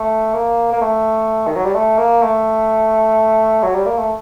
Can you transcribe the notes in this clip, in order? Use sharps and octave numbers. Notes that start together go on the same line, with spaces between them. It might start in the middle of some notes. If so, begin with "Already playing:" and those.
Already playing: A3
A#3
A#3
A3
D#3
F#3
G3
A3
A#3
A3
F#3
G3
A#3
A3